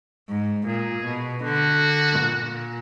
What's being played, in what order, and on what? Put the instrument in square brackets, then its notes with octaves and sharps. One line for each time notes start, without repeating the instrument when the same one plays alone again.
[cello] G#2
[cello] A#2 [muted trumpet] G#4
[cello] B2
[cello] D3 [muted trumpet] F#4
[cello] A#2